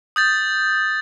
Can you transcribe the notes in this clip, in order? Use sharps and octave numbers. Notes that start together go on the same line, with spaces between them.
D#6 G6 A6